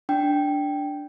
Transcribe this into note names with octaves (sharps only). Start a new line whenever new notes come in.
D4 G5